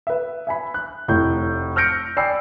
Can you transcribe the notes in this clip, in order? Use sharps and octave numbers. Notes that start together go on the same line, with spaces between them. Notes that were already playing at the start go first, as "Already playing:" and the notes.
B4 E5
E5 G#5 B5
F#6
F1 A2 G6
E6 F6 G6 A#6 C#7 D7
D5 G5 G#5 B5 E6 C7